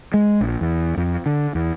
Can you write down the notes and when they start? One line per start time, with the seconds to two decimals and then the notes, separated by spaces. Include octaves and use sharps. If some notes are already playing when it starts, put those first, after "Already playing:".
0.14 G#3
0.41 A#1
0.61 E2
0.97 F2
1.26 D3
1.55 E2